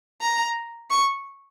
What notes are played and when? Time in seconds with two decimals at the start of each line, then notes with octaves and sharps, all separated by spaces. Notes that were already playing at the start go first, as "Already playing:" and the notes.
0.21 A#5
0.90 C#6